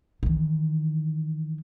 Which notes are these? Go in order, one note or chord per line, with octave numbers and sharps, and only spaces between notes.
D#3 E3